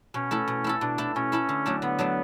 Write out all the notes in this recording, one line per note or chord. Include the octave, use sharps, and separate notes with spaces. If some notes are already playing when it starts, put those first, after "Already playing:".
B2 C#4
A3 E4 A4
B2
A3 E4 A4
B2 D4
A3 E4 A4
B2 C#4
A3 E4 A4
D3
F#3 A3 D4
D3 B3
F#3 A3 D4